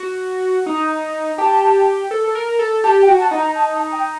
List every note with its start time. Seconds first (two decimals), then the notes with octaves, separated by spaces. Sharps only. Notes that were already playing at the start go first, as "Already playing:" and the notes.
Already playing: F#4
0.66 D#4 A#5
1.38 G4 A5
2.11 A4
2.24 A4
2.35 A#4
2.59 A4
2.84 G4 A5
3.01 G5
3.08 F#4
3.19 A5
3.31 D#4
3.37 A#5
3.55 A5
3.74 A5
3.92 G5